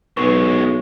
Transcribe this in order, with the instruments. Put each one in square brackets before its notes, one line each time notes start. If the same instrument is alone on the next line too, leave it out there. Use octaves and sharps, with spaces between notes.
[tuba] B1 [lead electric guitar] F#2 G#3 [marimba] B4 [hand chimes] C#6